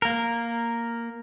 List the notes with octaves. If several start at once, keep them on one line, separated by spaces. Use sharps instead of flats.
A#3 A#4